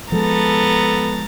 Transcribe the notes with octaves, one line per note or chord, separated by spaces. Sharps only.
F3 G#3 B3 A4 A#5 A6